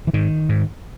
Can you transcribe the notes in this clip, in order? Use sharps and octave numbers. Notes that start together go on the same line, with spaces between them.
E3
G#2 D#3
G#2